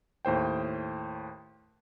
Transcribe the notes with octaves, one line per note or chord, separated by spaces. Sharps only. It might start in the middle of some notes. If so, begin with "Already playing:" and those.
D#2 A2 C5 G5